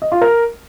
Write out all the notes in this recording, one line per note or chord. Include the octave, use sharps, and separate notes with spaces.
D#5
F4
A#4